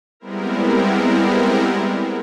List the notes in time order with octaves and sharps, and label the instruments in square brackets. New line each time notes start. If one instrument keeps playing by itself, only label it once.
[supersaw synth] G3 G#3 B3 C4 E4 A#4